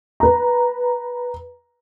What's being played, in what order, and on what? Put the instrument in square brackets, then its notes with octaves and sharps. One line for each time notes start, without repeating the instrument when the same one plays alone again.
[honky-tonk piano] B4 A#5